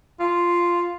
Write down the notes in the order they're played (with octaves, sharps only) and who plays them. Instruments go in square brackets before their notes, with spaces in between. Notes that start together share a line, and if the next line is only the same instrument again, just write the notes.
[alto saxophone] F4